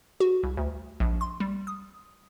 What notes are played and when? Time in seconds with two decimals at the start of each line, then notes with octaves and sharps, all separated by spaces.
0.20 F#4
0.43 C2
0.57 D2
1.00 A#1
1.21 C6
1.40 G3
1.67 D#6